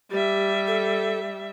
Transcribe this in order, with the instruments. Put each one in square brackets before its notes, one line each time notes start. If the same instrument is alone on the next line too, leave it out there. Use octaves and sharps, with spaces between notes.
[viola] G3 E5 [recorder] G4
[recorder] A4